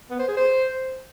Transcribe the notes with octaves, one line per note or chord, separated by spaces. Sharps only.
B3
C5
G#4
C5